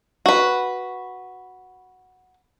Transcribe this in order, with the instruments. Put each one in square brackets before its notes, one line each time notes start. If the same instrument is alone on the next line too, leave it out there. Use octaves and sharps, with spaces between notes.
[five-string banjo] F#4 B4